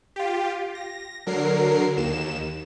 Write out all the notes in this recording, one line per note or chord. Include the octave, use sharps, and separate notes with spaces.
F4 G4
A#6
D3 F#3 A#4 C7
D#2 E7